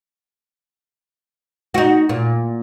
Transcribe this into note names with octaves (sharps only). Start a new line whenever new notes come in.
D#4 F#4
A#2